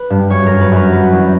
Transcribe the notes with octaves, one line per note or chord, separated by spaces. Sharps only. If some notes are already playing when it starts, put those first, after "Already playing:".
Already playing: B4
G2
F#2 C#5
F#2 A#4
B4
F#2 A#4
F#3 B4
E2